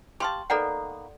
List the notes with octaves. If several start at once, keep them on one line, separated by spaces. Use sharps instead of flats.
G4 F5 A5 C6 C#6
D#3 A#3 B3 A4 D5 F#5